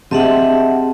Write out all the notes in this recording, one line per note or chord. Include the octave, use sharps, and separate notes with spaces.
C4 G4 G#4 D#5 E5 F#5 A5